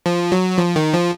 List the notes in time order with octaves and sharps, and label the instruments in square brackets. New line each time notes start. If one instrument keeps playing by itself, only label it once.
[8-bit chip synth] F3
F#3
F3
D#3
F3